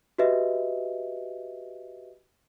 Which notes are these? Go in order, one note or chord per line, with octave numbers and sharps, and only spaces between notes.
F#4 G4 B4 D#5 E5